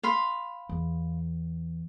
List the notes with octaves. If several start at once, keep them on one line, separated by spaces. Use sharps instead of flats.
F5 B5 C6
E2